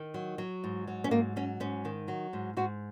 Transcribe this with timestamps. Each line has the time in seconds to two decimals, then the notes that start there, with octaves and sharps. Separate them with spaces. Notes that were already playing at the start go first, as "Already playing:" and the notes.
Already playing: D#3
0.14 F#3
0.38 F#3
0.64 G#2
0.88 F#3
1.04 C#4
1.11 G#2 A#3
1.36 F#3 C#4
1.60 G#2 C#4
1.85 D#3
2.08 F#3
2.33 G#2
2.57 G#2 F#4